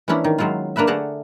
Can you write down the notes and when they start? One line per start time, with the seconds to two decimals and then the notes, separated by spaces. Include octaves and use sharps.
0.08 E3 G#3 A#3 C#4 D4 E4
0.24 D#3
0.38 D#3 F#3 G#3 E4 F4
0.76 A#3 D4 A#4 B4 E5
0.87 D3 A3 G#4 A#4 F#5 A5